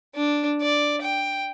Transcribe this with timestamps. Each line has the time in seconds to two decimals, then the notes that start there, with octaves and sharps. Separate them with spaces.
0.16 D4
0.62 D5
1.02 G5